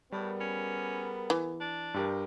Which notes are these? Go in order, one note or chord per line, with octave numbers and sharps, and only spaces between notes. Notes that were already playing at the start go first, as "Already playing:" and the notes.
A2 G3 B3 G#4 A#4
C#4
E3
D4
G2 G4 A#4